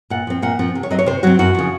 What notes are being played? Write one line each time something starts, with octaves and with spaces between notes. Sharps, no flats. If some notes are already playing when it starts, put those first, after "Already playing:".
A#2 F#5
F3 C4
A#2 F#5
F3 C4
C3
C#5
F#3 C4 D#5
C#5
C3 C5
F#3 C4 F#4
F#2 F#4
C#3 F3